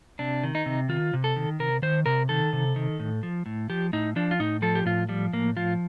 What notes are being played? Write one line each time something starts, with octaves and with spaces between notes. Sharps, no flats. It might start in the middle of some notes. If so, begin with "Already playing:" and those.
C3 D4
D#3
D#4
C3
D#3 F4
C3
A4
D#3
C3 A#4
D#3 C5
C3 A#4
D#3 A4
C3
D#3
A2
F3
A2
F3 G4
A2 D#4
F3 D4
F4
A2 D#4
F3 A4
G4
A2 F4
F3 G3
A2 A#3
F3 F4